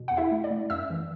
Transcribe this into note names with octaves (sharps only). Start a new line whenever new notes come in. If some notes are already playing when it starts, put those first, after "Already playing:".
Already playing: B2
E2 F#5
E4 E5
A3
D5
A3
F#2 E5 E6
E3